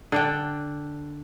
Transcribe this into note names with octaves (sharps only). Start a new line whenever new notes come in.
D3 D4 G5